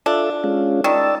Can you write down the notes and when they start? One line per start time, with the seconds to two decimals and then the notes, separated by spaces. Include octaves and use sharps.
0.06 D4 F4 A4 E5
0.44 G#3 C#4 F4
0.84 D#3 D5 A5 E6